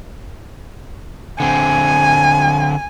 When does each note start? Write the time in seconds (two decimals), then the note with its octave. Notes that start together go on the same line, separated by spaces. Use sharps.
1.40 D3 C4 G#5